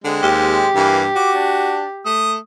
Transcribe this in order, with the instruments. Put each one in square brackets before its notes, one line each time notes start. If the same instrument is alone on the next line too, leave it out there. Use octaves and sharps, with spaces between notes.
[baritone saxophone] D3 [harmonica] G#3 C4
[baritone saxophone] D#2 [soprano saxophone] G4
[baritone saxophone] G2 [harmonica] E3 A#3
[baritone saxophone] F#4 [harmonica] D6
[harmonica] D4
[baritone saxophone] A3 [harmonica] D#6